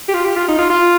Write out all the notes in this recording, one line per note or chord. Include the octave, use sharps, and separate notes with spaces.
G4
F4
G4
F4
D#4
F4
F4